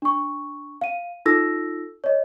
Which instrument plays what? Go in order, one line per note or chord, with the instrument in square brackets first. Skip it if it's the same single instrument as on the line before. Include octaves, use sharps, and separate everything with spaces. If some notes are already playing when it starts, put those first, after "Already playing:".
[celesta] D4 C#6
F5 D#7
D#4 F4 A4 E6 A#6
C#5 D#5